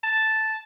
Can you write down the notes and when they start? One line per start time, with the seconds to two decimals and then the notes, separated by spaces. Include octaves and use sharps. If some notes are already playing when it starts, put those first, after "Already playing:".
0.04 A5